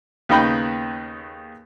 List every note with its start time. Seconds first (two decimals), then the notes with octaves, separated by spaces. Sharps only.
0.29 D#2 C#3 B3 D#4 G5 B5